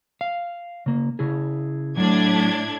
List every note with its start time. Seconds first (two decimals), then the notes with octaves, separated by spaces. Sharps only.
0.21 F5
0.86 C#3 A#3
1.19 C#3 E4 G#4
1.97 A2 F#3 D4 G#6